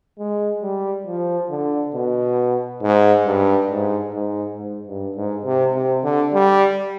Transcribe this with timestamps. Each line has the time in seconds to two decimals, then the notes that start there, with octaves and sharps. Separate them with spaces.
0.19 G#3
0.63 G3
1.07 F3
1.50 D3
1.94 B2
2.82 G#2
3.26 G2
3.70 G#2
4.14 G#2
4.58 G#2
4.88 G2
5.16 G#2
5.45 C3
5.74 C3
6.04 D3
6.33 G3